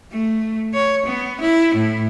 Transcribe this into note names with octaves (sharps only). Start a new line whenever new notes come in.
A3
C#5
B3
E4
A2